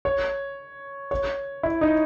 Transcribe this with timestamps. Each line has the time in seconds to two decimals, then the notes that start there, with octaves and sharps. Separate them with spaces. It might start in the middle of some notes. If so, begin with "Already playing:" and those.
0.05 C#5
1.11 C#5
1.63 E4
1.81 D#4